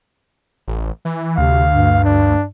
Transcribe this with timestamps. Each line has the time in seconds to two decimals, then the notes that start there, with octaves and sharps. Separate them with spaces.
0.68 A1
1.05 E3
1.38 D2 C3 F5
1.75 G2
2.05 D4